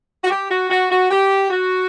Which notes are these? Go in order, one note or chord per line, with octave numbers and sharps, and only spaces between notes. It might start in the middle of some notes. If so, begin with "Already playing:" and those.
F#4
G4
F#4
F#4
F#4
G4
F#4